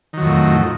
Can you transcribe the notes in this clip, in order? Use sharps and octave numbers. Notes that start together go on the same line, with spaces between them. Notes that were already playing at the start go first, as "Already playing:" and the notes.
F2 A2 D#3 F#3